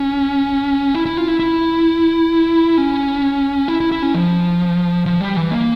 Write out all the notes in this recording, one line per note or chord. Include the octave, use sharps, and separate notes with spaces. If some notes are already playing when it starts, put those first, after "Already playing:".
Already playing: C#4
E4
E4
F4
E4
E4
C#4
E4
E4
E4
C#4
F3
F3
G3
E3
A#3